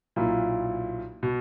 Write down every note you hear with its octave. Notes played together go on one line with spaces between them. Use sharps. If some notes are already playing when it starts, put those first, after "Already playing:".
B1 A#2 A#3 E4
B2